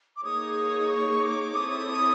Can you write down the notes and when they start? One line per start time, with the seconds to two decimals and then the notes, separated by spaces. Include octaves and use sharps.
0.17 D6
0.24 A#3 D#4 G#4 C#5 D#6
0.89 C#6
1.22 D6
1.55 C4 E4 A4 C#5 D#6